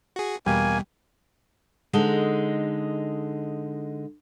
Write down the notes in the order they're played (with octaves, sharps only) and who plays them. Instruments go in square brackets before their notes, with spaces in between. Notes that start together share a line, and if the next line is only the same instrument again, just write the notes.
[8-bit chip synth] F#4 G#4
[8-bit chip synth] E2 B2 [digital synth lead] G3 [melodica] A#3 G#5
[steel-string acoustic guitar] D3 G#3 D#4